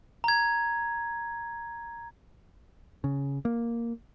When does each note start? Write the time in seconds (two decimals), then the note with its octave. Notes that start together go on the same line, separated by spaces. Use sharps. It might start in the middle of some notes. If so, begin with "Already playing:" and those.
0.24 A#5 G#6
3.04 C#3
3.45 A#3